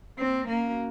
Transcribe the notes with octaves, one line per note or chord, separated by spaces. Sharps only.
A#3 C4
A#3 C#4
F#4